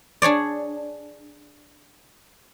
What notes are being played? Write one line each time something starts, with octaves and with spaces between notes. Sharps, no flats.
D4 G#4 C#5 D5